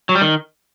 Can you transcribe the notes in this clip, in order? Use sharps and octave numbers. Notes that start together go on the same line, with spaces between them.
F#3
G3
D#3